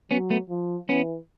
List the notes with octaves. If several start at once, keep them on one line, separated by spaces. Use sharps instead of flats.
F#3 B3 C#4
A3 B3
F3
E3 B3 C#4